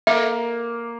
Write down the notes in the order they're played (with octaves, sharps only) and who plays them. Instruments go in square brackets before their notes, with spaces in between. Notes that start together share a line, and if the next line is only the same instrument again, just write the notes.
[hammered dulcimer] A#3 [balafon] E5